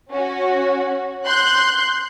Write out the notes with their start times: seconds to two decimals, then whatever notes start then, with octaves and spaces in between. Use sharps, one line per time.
0.11 C#4 F#4
1.26 C6 F#6 G6